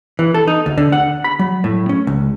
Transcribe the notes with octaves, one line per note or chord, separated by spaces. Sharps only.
E3
A4
D#4
D2
D3
F#5
B5
F#3
A2
C#4
C#2